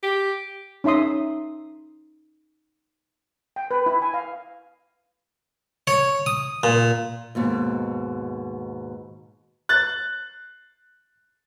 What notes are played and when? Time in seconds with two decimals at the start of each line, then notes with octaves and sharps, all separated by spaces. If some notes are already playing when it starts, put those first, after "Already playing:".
0.03 G4
0.84 C#4 D#4 E5 C6 D#6
3.56 G5
3.71 B4
3.86 E4
4.02 G#5
4.14 F5
5.87 C#5
6.26 D#6
6.63 A#2
7.35 D#2 G#2 B2
9.69 F#6 A6